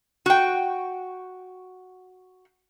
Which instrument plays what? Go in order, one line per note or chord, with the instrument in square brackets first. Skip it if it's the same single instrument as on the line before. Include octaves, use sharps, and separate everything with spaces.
[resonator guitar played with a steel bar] F#4 G5